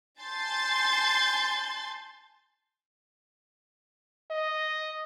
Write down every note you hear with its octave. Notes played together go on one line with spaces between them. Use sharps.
G#5 A5 C6 G6 A6 C7
D#5